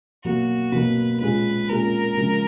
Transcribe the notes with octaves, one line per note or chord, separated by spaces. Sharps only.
B2 F#3 A#3 F#4
B2 F#3 A#3 B4
A#2 G#3 C#4 G#4 B4
A#2 G#3 C#4 G#4 A#4
C#3 F3 G#3